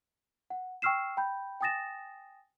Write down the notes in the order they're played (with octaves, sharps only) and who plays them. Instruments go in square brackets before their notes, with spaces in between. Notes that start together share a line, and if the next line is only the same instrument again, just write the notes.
[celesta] F#5
G5 C#6 E6 F6 C7 E7
G5 B5 G6
G5 G#5 D#6 A6 A#6 E7